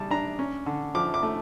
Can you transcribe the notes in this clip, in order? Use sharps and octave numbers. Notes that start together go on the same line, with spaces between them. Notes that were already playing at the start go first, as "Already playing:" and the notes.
Already playing: C#3 G3 A5
D4 A#5
C#4
D3
F3 D6
D6
A3